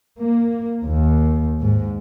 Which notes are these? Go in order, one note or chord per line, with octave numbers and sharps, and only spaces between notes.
A#3
D#2
G#2